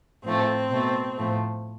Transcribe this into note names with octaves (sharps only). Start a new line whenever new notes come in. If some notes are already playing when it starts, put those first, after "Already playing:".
A2 F3 A3 C4
B2 A3
A2 F3 A3